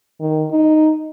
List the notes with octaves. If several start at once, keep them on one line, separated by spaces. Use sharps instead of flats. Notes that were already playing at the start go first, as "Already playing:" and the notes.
D#3
D#4